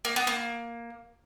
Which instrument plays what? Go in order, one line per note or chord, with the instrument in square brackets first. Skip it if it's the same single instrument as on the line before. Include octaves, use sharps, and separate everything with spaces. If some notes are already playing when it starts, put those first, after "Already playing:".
[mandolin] A#3
B3
A#3